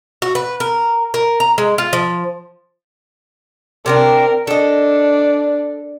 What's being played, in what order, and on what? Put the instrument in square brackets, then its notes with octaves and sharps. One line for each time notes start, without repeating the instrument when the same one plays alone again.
[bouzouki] F#4
B4
A#4
A#4
A#5
G#3
F4
F3
[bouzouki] C3 C4 D4 [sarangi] A#4
[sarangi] D4 [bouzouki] A4 D#5